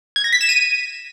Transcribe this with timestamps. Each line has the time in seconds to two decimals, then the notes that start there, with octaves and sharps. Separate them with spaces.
0.16 G#6
0.24 A#6
0.32 B6
0.41 E7
0.49 D#7